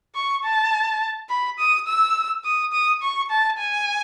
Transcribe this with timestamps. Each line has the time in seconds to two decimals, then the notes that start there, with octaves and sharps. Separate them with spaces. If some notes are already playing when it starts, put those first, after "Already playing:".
0.15 C#6
0.44 A5
1.29 B5
1.59 D#6
1.87 E6
2.44 D#6
2.72 D#6
3.02 C#6
3.30 A5
3.58 G#5